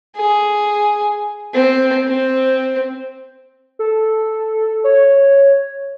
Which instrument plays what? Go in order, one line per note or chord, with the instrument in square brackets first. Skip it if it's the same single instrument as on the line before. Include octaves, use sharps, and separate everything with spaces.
[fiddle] G#4
C4
C4
[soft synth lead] A4
C#5